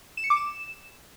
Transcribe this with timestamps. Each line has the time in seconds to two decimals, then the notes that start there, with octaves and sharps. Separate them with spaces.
0.17 E7
0.24 C#7
0.30 D6
0.37 E7